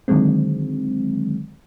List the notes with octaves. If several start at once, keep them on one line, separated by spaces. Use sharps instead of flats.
D3 D#3 F#3 G#3 C4